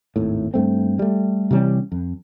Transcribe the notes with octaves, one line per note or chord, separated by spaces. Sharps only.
G#1 D#2 A2
G2 A3 C4
G3 A3
C3 E3 G3 C#4
F2